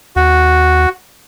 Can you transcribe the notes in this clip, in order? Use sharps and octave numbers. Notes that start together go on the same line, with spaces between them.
D#2 F#4